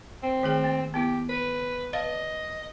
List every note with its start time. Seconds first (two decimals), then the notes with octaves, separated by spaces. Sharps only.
0.23 C4
0.43 D#3 A3 G#4
0.64 A#3
0.94 B3 E4 G4
1.29 B4
1.93 B4 D#5 F5 A5